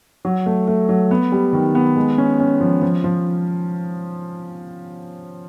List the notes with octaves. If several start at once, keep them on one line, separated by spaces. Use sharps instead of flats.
F#3
A3
A3
F#3
B3
G3
D#3
B3
G#3
C#4
C#4
F3
F3
F3